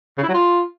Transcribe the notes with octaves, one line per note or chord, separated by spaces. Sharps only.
C#3
E4
F#3
F4